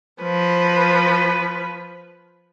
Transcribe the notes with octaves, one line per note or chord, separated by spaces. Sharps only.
F3 B4